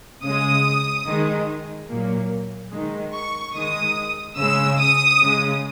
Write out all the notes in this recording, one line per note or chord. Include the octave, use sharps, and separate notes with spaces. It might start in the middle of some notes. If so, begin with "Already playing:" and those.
C#3 G#3 D#6
D#3 G#3
A#2 F#3 A#3
D#3 G#3
C#6
D#3 G#3 D#6
C#3 G#3 E6
D#6
C#3 G#3